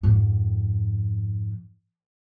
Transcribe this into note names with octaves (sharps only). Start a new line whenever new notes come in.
F2 G#2